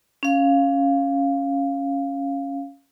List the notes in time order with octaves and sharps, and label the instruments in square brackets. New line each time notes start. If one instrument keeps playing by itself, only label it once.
[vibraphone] C#4 F5